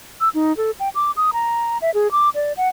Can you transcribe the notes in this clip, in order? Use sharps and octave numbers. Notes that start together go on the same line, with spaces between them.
E6
D#4
A4
G5
D6
D#6
A#5
E5
G#4
D6
D5
F#5